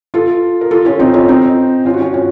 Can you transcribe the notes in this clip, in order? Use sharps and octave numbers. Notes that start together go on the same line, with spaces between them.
F4 A4
A#4
F4 A4
C#4 F4
C4 D#4
C#4 F4
C4 D#4
C#4 F4
F#4
C#4 F4
C#4 F4